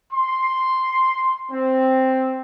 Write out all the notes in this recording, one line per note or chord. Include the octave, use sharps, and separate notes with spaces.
C6
C4